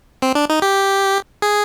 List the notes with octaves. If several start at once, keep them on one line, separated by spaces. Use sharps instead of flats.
C4
D4
D#4
G4
G#4